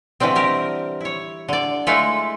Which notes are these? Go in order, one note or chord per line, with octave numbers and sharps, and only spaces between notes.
B2 D3 E3 G3 C4
G4 A#4
E4 C#5
D3 D5
G#3 A3 E4 F4 A4